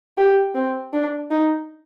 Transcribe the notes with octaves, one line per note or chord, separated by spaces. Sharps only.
G4
C4
D4
D#4